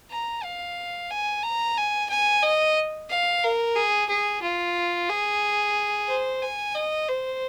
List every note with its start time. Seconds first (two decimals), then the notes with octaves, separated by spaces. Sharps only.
0.10 A#5
0.43 F5
1.10 G#5
1.43 A#5
1.77 G#5
2.09 G#5
2.42 D#5
3.09 F5
3.43 A#4
3.76 G#4
4.09 G#4
4.42 F4
5.09 G#4
6.08 C5
6.42 G#5
6.75 D#5
7.09 C5